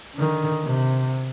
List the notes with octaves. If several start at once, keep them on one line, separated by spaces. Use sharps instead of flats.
D3 D#3
C3